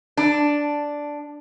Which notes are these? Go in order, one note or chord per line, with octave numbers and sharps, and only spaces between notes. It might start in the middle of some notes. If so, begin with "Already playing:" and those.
D4